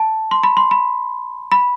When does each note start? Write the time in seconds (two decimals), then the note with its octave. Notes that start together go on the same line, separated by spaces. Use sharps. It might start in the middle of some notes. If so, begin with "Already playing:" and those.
Already playing: A5
0.31 C6
0.43 B5
0.57 C6
0.71 B5
1.52 B5